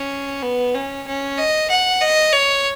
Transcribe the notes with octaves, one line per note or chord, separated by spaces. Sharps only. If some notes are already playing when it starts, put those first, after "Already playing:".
Already playing: C#4
B3
C#4
C#4
D#5
F#5
D#5
C#5